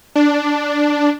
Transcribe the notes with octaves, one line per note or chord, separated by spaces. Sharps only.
D4